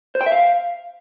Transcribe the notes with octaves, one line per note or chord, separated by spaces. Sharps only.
C5
G5
E5
F5